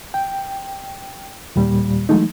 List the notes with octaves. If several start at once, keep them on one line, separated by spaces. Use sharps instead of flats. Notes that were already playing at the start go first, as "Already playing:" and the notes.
G5
D#2 A#2 G3
E3 F#3 G#3 A3 D#4